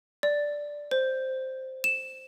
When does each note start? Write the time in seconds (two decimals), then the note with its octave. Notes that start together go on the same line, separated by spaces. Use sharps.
0.23 D5
0.91 C5
1.84 E7